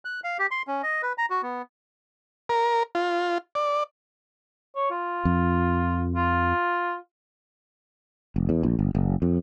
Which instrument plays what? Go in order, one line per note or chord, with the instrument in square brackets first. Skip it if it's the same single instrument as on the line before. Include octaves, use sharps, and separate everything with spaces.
[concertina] F#6
F5
G4
C6
C#4
D#5
B4
A#5
F#4
B3
[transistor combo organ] A#4
F4
D5
[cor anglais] C#5
F4
[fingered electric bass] F2
[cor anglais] F4
[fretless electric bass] F1
E2
A#1
G1
F#1
F2